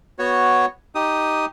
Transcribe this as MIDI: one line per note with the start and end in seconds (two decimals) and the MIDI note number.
0.19 0.66 59
0.19 0.66 66
0.19 0.66 73
0.95 1.45 63
0.95 1.45 67
0.95 1.45 87